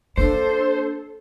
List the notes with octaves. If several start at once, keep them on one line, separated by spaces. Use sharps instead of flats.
A#3 D4 A4 C5